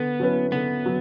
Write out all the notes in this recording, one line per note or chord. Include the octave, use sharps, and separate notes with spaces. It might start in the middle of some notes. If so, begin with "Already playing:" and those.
Already playing: D3 B3
F#3 C#4 E4 B4
D3 B3
F#3